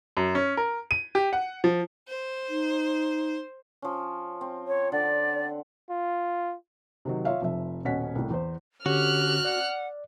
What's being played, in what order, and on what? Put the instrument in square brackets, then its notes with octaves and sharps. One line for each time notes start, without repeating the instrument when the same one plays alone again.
[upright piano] F#2
C#4
A#4
D#7
G4
F#5
F3
[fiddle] C5
[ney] D#4
[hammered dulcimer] F3 C#4
C4
[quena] C#5
[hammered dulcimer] D3 F#5 [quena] D5
[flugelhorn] F4
[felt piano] C3 D#3 F#3
F4 C#5 E5 F5
F1 F3 E5
D#1 B2 C#4 F#5 B6
C2 A2
E2 C5
[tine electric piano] D3 C#4 C#5 [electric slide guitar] F#4 [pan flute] G4 [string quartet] F6 F#6
[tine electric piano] D5 [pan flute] F#5